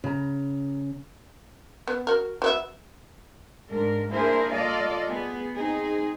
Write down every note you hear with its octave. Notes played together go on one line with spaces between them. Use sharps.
C#3 A#5
B3
F#4 A#4
F#3 B3 E5
G#2 D4 A#4
A#3 D4 E4 G#4 A#4 C5
F4 A4 D5 D#5 F5
B3 G#4
C4 D#4 G#4